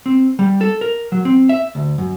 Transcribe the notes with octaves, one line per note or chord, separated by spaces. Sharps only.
C4
G3
A4
A#4
F#3
C4
E5
D2
F#2